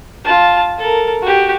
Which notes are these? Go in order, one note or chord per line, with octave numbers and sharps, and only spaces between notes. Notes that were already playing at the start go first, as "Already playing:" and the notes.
F4 A5
A4 A#4
F#4 G4